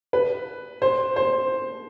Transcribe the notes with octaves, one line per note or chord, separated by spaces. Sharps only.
B4
C5
C5